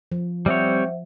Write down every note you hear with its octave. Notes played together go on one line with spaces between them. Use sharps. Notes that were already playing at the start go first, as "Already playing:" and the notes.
F3
G3 C4 C5 C#5 E5 F#5